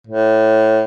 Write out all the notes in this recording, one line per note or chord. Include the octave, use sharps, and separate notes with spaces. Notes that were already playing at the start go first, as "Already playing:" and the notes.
A2